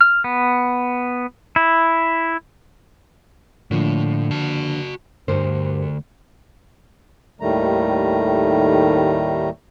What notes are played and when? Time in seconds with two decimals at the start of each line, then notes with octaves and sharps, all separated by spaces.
0.01 F6
0.24 B3
1.56 E4
3.71 A2 D3 F3 A#3
4.31 F#4 A5
5.28 D2 G2 A#4 C5
7.40 D#2 A2 D#3 G3 A3 A#5